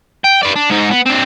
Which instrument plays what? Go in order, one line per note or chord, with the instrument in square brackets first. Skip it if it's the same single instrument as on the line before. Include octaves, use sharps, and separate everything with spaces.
[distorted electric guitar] G5
B4 D5
D4
G#2 D#4
B3
C4 D4